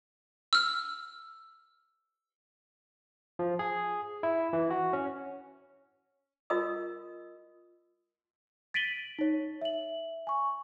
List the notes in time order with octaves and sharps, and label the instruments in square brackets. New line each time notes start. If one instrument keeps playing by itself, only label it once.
[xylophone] E6 F6
[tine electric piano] F3
G#4
E4
E3
F#4
C#4
[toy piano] F4 A#4 D#5 D#6
[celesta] A6 B6 D7 D#7 F#7 G7
D#4 C#5
E5 F#7
G#5 C#6